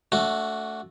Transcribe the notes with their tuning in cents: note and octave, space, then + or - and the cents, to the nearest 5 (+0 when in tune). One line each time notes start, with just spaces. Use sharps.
A3 +0 D4 -30 F#4 +0